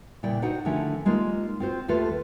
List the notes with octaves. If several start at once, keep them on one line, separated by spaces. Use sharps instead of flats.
A#2 C#3 G3 E4 D5 G5
D#4 F#4 C5 F#5 G5
D3 D#3 F3 A3 C#4 E4
G3 G#3 A#3 D#4 F4
C4 F4 F#4 C5
D#2 A3 F4 A4 B4 A5